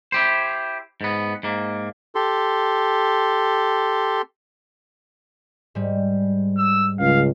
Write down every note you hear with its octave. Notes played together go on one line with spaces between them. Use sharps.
E4 G4 C5
G#2 B3
G#2 A#3
G4 A4 C6
G#2 G3
E6
C#2 F5